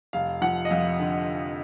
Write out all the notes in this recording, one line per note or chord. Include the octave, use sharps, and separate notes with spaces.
F1 F5
F3 F#5
D#5
F2 F5
D3